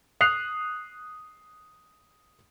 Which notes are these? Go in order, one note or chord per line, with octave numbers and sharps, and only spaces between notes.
D#6 F#6 C7 F7